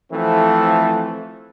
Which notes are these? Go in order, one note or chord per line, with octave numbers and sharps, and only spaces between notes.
E3 F3 A3 C4 A4